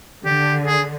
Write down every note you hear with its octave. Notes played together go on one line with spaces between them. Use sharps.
D3 G4
G#4